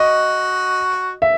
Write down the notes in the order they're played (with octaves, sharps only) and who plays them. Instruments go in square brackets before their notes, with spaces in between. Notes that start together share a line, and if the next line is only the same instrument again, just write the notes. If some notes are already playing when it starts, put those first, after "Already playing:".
Already playing: [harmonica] F#4 [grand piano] D#5
[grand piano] E5